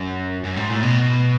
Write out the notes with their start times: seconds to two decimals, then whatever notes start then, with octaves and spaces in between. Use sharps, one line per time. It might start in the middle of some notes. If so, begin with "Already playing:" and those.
Already playing: F#2
0.45 F#2
0.57 G#2
0.70 A2
0.83 B2